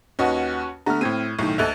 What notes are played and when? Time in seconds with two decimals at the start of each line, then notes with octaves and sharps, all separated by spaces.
0.19 D#2 C#4 F#4 B4 D#5 F#5
0.86 D3 A3 B3 A#5 F6
1.01 A2 C4 G#6 D#7
1.39 B1 A2 D#3
1.58 D2 A4 D#5 E5 F#6 F7